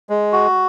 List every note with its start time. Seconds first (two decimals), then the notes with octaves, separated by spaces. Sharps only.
0.09 G#3
0.33 F#4